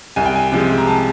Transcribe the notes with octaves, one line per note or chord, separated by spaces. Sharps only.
C2 G#5
G5
G#5
C3 F3 G#3
A#5
A5